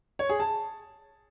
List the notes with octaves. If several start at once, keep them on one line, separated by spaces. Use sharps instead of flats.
C#5
G#4
A5